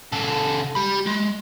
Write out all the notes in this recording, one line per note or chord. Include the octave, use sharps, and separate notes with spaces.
C#3 A4
G4 B5
G#3